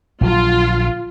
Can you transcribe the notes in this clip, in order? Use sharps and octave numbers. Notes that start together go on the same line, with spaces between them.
A#1 D3 F#3 F4